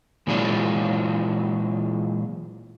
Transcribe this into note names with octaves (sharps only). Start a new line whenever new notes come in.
A#2 E3 F#3 G#3 D4 F4